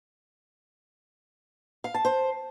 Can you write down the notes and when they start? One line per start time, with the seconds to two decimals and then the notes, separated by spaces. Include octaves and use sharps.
1.84 F5
1.94 A5
2.05 C5